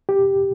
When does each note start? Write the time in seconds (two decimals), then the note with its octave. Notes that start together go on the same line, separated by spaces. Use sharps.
0.09 G4